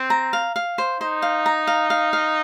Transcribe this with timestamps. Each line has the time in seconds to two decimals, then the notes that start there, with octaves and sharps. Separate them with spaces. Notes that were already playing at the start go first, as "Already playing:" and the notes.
Already playing: C4
0.10 A#5
0.33 F5
0.56 F5
0.78 C5
1.01 D#4 C5
1.22 F5
1.46 A#5
1.67 F5
1.90 F5
2.13 F5